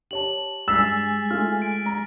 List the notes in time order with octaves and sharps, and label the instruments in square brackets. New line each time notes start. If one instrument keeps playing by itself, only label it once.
[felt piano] G4 C#5 A5 [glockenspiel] F#7
[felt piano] G2 [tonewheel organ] G#3 G#5 [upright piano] E6 [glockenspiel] A6 B6 C7
[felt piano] A3 F4 [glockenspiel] F6
[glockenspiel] D7
[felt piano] A#5